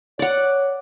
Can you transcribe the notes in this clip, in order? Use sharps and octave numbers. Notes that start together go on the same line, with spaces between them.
C#5 D5 F#5